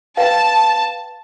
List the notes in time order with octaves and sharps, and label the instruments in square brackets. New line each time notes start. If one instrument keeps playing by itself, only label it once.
[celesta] B4 F5 G5 [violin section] A5